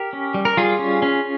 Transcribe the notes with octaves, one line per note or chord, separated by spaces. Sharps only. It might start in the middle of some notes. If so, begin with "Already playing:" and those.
Already playing: G4 A#4
C#4
G3
A#4
G3 F4 G#4
C#4
C#4